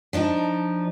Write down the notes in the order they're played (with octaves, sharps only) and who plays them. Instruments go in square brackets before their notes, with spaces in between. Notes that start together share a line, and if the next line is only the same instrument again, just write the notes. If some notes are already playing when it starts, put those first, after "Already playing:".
[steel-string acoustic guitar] F3 D4 D#4